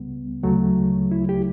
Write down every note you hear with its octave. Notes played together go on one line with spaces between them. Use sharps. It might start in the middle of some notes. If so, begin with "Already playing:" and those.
Already playing: C#2 C#3 G3 B3
D2 C#3 F#3 A3
E4
G4